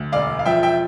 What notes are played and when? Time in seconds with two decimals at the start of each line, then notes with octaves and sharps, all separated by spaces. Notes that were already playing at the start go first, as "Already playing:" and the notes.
Already playing: D2
0.12 E1 D5 F5
0.39 F5
0.45 F3 E5 G5
0.63 E5 G5